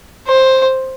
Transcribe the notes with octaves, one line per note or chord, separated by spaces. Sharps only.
C5